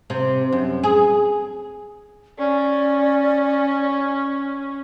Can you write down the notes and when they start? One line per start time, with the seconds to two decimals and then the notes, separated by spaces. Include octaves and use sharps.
0.10 C3
0.52 F#2
0.83 G#4
2.38 C#4 D5